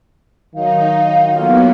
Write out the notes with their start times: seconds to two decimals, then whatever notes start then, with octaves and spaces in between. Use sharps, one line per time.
0.55 D#3 F#3 D#4 F5
1.35 F#3 A#3 B3 F4 A4